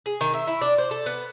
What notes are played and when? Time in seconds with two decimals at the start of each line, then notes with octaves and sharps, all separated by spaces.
0.06 G#4
0.21 D#3
0.33 E5
0.47 E4
0.61 D4
0.78 C5
0.91 A4
1.06 B3